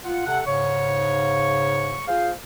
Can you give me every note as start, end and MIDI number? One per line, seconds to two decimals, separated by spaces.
0.05 0.23 65
0.05 0.23 78
0.26 0.41 48
0.26 0.41 69
0.26 0.41 78
0.46 2.01 44
0.46 2.01 49
0.46 2.01 73
0.46 2.01 85
2.08 2.30 65
2.08 2.30 68
2.08 2.30 72
2.08 2.30 77